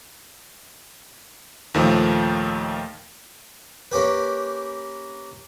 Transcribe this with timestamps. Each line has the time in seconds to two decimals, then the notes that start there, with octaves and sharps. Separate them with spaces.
1.74 D#2 A#2 D#3 F3 A3
3.91 A#3 C#4 G4 B4